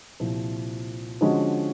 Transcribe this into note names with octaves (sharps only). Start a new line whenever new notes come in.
C2 A#2 F3
D3 F3 G#3 C#4 F#4